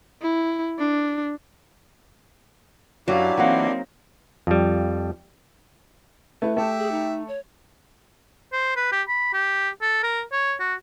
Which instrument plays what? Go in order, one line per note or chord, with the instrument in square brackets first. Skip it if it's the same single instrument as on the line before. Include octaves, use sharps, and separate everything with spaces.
[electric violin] E4
D4
[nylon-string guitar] F#2 [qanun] F#3 [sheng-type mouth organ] D4 E4 G4 [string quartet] F5
[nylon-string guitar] E3 F5 F#5 [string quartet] A#3 C4 D#4
[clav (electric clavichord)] F2 G3
[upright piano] A3 E4 [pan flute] B4
[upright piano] A3 [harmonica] G4 E5 [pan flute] A5
[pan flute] G#4
D#4
C#5
[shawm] C5
B4
G4
B5
G4
A4
A#4
C#5
F#4